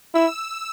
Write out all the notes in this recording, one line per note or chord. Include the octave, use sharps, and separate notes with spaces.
E4 E6